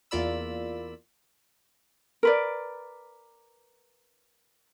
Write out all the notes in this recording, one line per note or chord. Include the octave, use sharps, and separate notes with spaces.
E2 A#3 F4 D5 B5 E6
A#4 B4 D5